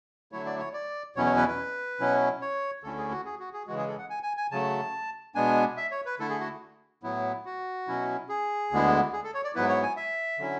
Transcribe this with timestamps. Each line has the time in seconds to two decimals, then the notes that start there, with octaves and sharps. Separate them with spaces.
0.32 D3 F#3 A3 E4 C#5
0.46 D5
0.59 C#5
0.73 D5
1.16 E2 B2 F#3 C#4 E4 C#5
1.26 C#5
1.37 B4
1.48 B4
2.00 B2 F#3 C#4 E4
2.41 C#5
2.83 D2 D3 A3 C#4 E4 A4
2.98 G#4
3.12 F#4
3.25 G#4
3.40 F#4
3.53 G#4
3.67 C#3 E3 G#3 F#4
3.78 G#4
3.88 A4
3.98 F#5
4.10 G#5
4.23 G#5
4.37 G#5
4.51 C#3 F#3 A3 A5
5.35 B2 G#3 B3 D4 G#5
5.77 E5
5.91 C#5
6.06 B4
6.19 D3 A3 E4 A4
6.30 G#4
6.40 F#4
7.03 A2 F#3 B3 E4
7.45 F#4
7.87 B2 F#3 C#4 E4
8.29 G#4
8.71 D2 D3 G#3 B3 E4
9.13 G#4
9.24 A4
9.34 C#5
9.44 D5
9.55 G#2 F#3 B3 E4 B4
9.69 C#5
9.83 G#5
9.97 E5
10.39 D3 F#3 C#4 E4